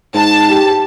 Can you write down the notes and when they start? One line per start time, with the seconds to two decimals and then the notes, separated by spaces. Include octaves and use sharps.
0.15 G#2 A5
0.49 G4